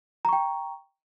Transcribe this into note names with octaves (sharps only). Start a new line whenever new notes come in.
G5 A#5 C#6